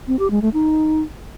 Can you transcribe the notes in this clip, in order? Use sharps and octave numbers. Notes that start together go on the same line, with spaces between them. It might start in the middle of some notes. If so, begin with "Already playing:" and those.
C4
G4
G#3
A3
D#4